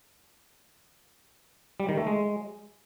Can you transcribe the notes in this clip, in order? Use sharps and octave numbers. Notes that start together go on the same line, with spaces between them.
G3
D#3
A3
G#3